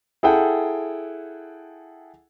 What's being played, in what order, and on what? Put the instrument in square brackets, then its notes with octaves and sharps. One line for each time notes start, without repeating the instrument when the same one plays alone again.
[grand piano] E4 G#4 A4 F#5 G5